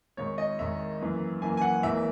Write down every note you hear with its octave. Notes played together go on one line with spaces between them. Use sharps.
G#1 G#2 D#3 C#5
D#5
G#1 G#2 D#3 E5
F#2 E3 A#3
F#2 E3 A#3 G#5
G#5
F#5
G#1 G#2 E3 A#3 E5